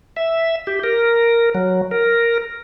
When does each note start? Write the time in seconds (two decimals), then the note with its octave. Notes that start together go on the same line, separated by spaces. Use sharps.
0.17 E5
0.67 G4
0.84 A#4
1.55 F#3
1.91 A#4